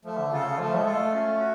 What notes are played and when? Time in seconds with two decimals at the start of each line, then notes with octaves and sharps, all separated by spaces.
0.05 F3 A3
0.18 D3
0.32 C#3 F4 A4
0.46 C#3
0.59 F3 A3
0.77 G#3
0.86 F4 A4
0.94 A3
1.13 C#4
1.39 F#4